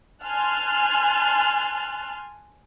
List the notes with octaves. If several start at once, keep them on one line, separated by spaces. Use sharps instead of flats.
G#5 A5 C6 F6 F#6